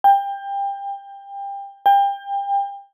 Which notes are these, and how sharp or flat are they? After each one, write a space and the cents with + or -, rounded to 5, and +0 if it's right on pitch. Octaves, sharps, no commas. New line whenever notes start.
G5 +25
G5 +30